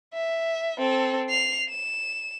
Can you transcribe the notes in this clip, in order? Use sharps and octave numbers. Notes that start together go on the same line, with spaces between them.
E5
C4 A4
C7 F7
E7